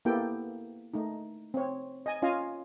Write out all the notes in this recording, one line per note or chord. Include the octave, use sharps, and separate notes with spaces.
A#3 B3 E4 G4 A4 G5
A3 D#4
C4 C#5
D#5 G#5
C#4 F4 D#5 F5 G#5